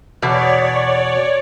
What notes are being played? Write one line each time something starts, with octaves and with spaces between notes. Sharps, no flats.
E2 B2 C#5 D5